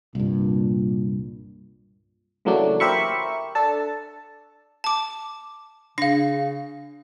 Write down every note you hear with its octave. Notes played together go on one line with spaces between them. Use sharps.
C2 G2 A#2
C#3 E3 F#3 A3 A#3 D4
G4 A#4 C5 E5 B5 C#6
D4 A4 A5
A5 D6
C#3 D4 F5 A#6